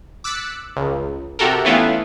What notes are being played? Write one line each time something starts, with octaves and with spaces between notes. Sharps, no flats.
D6 E6 F#6 A6 B6 C#7
C#2
C3 F#4 G4 A4 A#4
E3 A3 B3 C#4 E4 F4